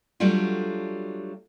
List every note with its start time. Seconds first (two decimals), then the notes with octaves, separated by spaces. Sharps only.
0.20 F#3 G3 A3 D4 F4